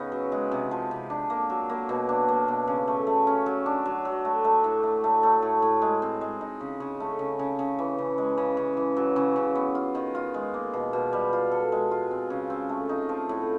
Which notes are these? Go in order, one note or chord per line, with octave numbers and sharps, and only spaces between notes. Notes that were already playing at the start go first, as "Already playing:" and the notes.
Already playing: C#3 B3 C#4 D#4
F#3
G#3
C3
F3
C3
D4
A#3
F#3
A#3
B2
D4
A#3
B2
C#3
A3
A3
C#4
F#3
D4
F#3
F#3
A3
A3
A2
A3
A3
A3
A2
A2
G#3
C4
G#3
D#4
C#3
C#3
A3
C#3
C#3
C#3
E3
C#3
G#3
C#3
C#3
E3
F#3
C#3
C#3
B3
F4
D#3
F4
G#3
A#3
B2
B2
G3
F4
A4
G#3
F4
C4
C#3
C4
A3
D#4
F3
A2